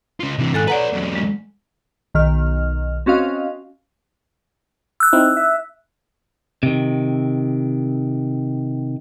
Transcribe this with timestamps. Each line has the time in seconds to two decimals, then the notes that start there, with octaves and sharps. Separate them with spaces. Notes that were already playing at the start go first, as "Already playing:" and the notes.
0.20 C#3 F4
0.39 C3 E3
0.54 G#2 D#3 A4 G#5 F#6
0.68 B4 C#5 D5 F#5 A#5
0.93 E2 F#3
1.15 G#3
2.14 B1 D#3 F6
3.06 C4 C#4 F#4 D#5 F5
5.00 E6 F#6
5.13 C4 D#4 E4
5.37 E5
6.63 C3 D#3